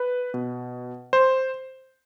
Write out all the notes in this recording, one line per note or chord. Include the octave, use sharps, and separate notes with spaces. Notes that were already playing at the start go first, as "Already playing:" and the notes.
Already playing: B4
B2
C5